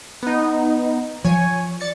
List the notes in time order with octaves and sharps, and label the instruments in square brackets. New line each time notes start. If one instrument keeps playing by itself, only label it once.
[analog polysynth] B3 D#4
[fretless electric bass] F3 [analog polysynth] C#5 G#5
[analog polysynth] D5 A6 C#7